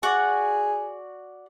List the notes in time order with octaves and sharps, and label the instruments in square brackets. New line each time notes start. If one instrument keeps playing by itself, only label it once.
[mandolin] F#4 D5 [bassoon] G#4